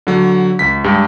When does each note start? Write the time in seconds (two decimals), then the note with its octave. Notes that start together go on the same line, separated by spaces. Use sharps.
0.07 D3 F#3
0.59 C#2 B6
0.84 G2 G#3 G4